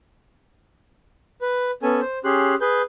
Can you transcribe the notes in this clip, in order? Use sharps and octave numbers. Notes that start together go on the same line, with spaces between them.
B4
B3 C#4 A4 G#5
C5
C#4 G4 G#4 C6 F#6
G#4 B4 G6